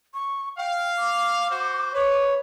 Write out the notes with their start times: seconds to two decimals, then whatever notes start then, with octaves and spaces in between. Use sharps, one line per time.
0.14 C#6
0.58 F5 G5
0.97 D6
1.50 F#4 C5
1.95 B4 C#5